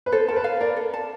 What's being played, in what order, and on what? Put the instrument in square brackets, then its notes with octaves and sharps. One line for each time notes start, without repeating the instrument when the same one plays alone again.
[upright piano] B4
[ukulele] A4 [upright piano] C5
[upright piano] A#4 [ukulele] A5
[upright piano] B4
[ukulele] F5
[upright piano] A#4 [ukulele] D5
[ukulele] A4
A5